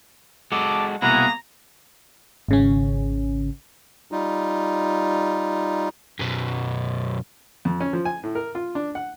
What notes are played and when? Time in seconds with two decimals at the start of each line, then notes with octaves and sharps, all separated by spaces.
0.52 G#3 F#4 A4 A5 D6
1.02 C2 B2 A#3 B3 E4 G#4 F#5 A#5
2.49 G#1 C#3 C#4
4.12 G3 D#4 F4
6.19 F#2 B2
7.65 F2
7.80 C#4
7.93 F3
8.05 G#5
8.23 A2
8.35 A#4
8.55 F4
8.75 D4
8.95 F#5